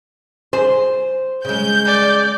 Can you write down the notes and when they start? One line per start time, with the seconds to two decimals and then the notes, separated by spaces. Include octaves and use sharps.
0.53 G#4 C5
1.45 C#3 G#3 G6
1.86 D5